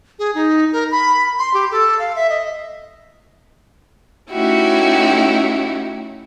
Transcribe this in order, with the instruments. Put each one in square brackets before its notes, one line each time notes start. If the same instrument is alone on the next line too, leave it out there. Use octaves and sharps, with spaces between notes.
[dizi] G#4
D#4
A#4
B5
C6
G4
A4
F5
E5
D#5
[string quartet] A3 C#4 D#4 E4 F#4 G4